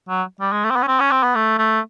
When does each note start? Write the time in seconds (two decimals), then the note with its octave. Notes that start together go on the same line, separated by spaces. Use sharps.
0.09 F#3
0.40 G3
0.52 G#3
0.64 A3
0.70 C4
0.76 B3
0.83 C#4
0.88 C4
1.00 C#4
1.11 C4
1.23 B3
1.35 A3
1.59 A3